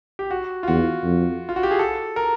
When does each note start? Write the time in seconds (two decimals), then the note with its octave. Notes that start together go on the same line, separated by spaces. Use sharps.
0.19 G4
0.31 F#4
0.63 F4
0.68 E2 F#4
1.04 F2
1.49 F4
1.56 F#4
1.63 G4
1.71 G#4
1.79 A4
2.16 A#4